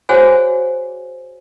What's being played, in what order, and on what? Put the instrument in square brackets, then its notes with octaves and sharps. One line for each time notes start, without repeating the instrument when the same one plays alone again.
[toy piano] F#4 G#4 C5 C#5 F#5 G#5